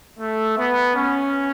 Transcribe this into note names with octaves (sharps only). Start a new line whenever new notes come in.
A3
B3
C#4